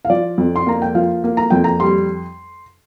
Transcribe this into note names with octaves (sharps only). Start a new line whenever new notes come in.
F5
F3 D5
F2
C6
A#3 A#5
G5
F3 F5
A#3
A#5
F2 G5
A#5
G3 C6